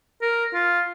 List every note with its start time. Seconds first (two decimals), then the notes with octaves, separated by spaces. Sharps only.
0.22 A#4
0.54 F4